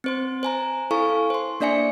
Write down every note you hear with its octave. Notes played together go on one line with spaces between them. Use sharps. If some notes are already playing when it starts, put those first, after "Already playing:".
C4 C5 C6
C5 G#5 A#5
E4 A4 F5 G#5 C#6
C5 C6
A#3 D4 D5 E5 G#5 C#7